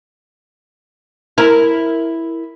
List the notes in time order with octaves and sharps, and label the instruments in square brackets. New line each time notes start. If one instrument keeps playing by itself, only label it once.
[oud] E4 A#4